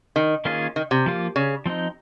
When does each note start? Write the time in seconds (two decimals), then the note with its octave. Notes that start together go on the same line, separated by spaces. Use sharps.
0.16 D#3
0.45 D#3 A#3 C#4 F4 G#4
0.76 D#3
0.91 C3
1.06 F3 A#3 F4
1.36 C#3
1.66 F3 C4 D#4